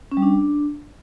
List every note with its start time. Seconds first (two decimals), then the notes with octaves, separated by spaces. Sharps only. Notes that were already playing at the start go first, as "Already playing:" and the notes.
0.12 C#4
0.17 G3
0.22 D4